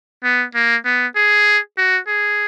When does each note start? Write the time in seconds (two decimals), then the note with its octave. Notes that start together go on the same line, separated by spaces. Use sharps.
0.24 B3
0.55 A#3
0.85 B3
1.16 G#4
1.78 F#4
2.08 G#4